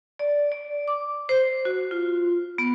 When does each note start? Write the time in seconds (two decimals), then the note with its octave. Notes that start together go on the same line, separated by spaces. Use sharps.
0.19 D5
0.52 D5
0.88 D6
1.29 C5
1.65 F#4
1.91 F4
2.58 B3